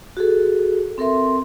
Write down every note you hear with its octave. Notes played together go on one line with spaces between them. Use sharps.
F#4 G#4 A4
C4 A4 A#4 E5 C6